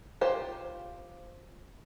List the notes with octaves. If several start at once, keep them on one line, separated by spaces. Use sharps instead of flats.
F4 G4 C5